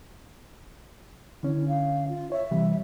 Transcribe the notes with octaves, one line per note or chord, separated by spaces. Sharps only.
D3 C#4 E4
F5
F4
C#5 E5
C3 E3 G3